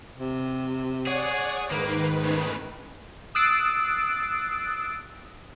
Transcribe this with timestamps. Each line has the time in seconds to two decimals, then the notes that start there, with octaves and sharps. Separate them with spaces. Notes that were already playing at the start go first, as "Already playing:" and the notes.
0.17 C3
1.07 G#4 C#5 D5 F#5
1.71 G#2 D#3 A#3 B4
2.24 A2 C#3
3.35 D#6 E6 F#6 A6 C7 D7